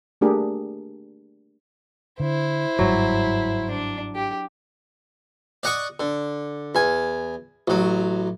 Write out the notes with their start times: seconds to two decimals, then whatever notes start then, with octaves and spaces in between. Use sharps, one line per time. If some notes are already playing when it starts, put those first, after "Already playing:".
0.21 A3 A#3 D4 G4 G#4 A#4
2.20 D3 E4 C5
2.79 G1 G#2 F#3 G3
3.70 D4
4.15 G4
5.63 D5 D#5 F#5 C#6 D#6
6.00 D3
6.75 E2 G#5
7.68 A1 F#3